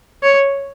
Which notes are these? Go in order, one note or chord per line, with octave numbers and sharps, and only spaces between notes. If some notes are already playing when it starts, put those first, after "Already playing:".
C#5